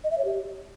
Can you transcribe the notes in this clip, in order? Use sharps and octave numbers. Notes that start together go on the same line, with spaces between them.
D#5
E5
C#5
G4